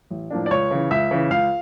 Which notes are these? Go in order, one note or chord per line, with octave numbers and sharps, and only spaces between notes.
A1
A2 F3 A#3 D4
D5
C#2 C#5
C#3 E3
C#2 E5
C#3 E3
C#2 F5